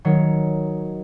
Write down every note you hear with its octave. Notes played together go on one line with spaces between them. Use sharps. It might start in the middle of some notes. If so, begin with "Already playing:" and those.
D#3 F#3 C#5